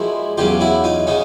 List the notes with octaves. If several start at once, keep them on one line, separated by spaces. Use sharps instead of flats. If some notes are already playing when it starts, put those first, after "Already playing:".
Already playing: A#2 F3 G#3 E4 F#4
E2 C#3 F#3 F4 G4
E4 F#4
D#4 F4
C#3 C#4 D#4